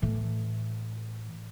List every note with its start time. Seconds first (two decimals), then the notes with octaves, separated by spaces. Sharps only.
0.02 A2 E3